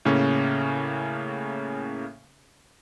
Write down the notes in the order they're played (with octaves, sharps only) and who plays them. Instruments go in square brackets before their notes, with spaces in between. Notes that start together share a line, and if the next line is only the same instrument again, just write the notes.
[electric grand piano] A2 C#3 A#3 C#4